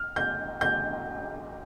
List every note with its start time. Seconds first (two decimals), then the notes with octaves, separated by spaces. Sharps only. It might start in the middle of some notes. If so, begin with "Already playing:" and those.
Already playing: F6
0.16 G6
0.61 G6